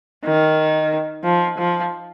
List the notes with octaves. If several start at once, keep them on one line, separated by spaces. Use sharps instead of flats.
D#3
F3
F3